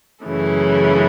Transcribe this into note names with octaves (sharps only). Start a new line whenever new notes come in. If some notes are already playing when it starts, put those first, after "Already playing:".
F#2 C#3 E3 A3